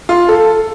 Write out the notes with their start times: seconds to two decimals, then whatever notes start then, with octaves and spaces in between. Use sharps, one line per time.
0.09 F4
0.28 A4